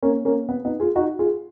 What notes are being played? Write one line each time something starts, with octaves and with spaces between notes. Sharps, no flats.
A#3 C#4
A#3 C#4
B3
B3 D#4
F4 G#4
D#4 F#4
F4 G#4